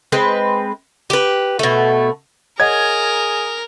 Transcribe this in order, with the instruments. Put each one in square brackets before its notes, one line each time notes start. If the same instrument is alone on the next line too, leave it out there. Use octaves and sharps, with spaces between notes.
[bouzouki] G#3 C4 B4
G4 B4
B2 A3
[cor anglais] G#4 [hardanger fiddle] A#4 [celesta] C#5 D#5 F#5 [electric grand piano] G#6